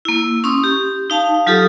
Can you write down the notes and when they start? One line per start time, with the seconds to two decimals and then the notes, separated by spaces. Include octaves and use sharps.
0.05 A#3 E4
0.44 C#4 C6 C#6 D#6
0.64 G4
1.10 D#4 F5 A5
1.47 F#3 F4 G4 A4 D#6